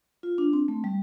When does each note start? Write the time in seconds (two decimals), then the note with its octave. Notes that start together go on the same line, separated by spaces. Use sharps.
0.23 F4
0.38 D4
0.53 C4
0.68 A3
0.84 G3